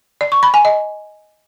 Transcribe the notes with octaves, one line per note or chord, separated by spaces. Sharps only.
D5
C#6
B5
G#5
D#5